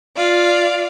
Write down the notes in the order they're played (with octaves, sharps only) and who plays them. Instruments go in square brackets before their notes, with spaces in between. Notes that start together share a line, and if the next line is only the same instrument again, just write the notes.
[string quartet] F4 D5 F5